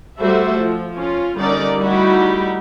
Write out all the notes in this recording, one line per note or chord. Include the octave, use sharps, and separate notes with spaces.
G3 A3 F#4 A4 C5 E5
F3
C#4 F4
D3 G3 C#4 D#4 A#4 D5
G3 A3 D#4 E4 F#4 G4